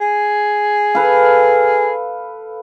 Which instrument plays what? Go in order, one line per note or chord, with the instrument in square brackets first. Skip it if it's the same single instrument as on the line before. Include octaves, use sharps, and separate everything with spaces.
[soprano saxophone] G#4
[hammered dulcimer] A4 B4 F5